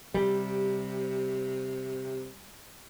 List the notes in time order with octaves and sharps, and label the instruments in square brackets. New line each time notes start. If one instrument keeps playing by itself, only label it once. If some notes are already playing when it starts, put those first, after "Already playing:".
[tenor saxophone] C3 [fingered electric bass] G3